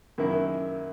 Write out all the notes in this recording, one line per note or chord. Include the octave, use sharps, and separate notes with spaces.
F#2 D#3 A#3 E4